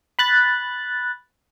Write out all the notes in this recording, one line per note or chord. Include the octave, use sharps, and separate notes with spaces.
B5 F#6 A6